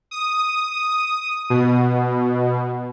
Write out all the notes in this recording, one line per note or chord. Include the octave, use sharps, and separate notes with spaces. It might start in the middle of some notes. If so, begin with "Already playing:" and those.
D#6
B2